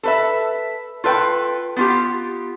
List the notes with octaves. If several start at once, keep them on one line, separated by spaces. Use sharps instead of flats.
A4 B4 E5
F4 A4 B4 G5
B3 F4 G4